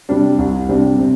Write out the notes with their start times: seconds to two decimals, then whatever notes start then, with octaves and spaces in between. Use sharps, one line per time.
0.09 C3 G3 D4
0.38 C2
0.69 C3 G3 D4
0.98 C3